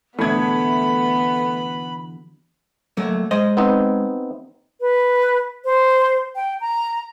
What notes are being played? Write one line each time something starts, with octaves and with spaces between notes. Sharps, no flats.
E2 B2 D3 A3 B3 B5 G#6
F#3 A3 A#3
G#3 C5 D#5
B3 C4 D#4
B4
C5
G5
A#5